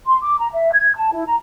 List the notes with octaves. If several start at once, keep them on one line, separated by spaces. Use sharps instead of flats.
C6
D6
A#5
E5
G#6
A5
E4
A#5